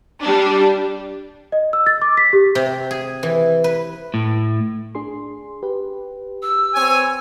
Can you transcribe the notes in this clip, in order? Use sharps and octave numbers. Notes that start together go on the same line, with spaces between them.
G3 D4
D#5
E6
A6
D6
B6
G4
C3
G#4
E3
B4
A2
D4 G#4 C6
G4 B4
E6
C4 C#5 G#5